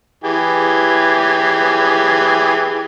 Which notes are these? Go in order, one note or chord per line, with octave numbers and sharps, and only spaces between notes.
E3 G4 G#4